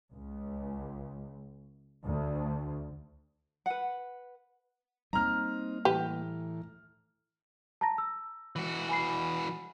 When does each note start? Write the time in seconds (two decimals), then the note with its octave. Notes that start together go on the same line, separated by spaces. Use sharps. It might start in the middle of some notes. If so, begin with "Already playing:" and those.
0.13 C#2
2.05 D2
3.66 B4 F#5
5.13 G3 A#3 C4 D#4 A#5 F6
5.85 A2 E3 G4 B4
7.81 A5 A#5 A#6
7.98 E6
8.56 E3 F#4
8.89 G#5 B5 C7